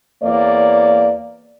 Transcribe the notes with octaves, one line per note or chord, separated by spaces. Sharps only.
E2 A#3 C#5 D5